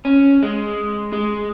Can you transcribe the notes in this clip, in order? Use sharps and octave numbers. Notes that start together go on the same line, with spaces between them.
C#4
G#3
G#3